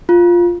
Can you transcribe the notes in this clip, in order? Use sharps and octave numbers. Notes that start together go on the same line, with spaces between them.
F4